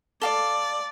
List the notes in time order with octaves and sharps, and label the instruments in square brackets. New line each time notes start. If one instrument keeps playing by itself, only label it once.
[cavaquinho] A4 F5 D6 [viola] D5